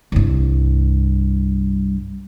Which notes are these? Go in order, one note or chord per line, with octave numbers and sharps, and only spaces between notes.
C2 G2